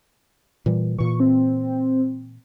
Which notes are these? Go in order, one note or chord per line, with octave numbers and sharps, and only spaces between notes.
A#2 E3 G3
A#2 E3 C#6
C4